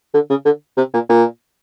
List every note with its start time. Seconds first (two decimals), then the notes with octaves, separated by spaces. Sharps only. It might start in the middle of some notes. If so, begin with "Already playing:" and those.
0.14 D3
0.30 C#3
0.45 D3
0.77 C3
0.93 A#2
1.09 A#2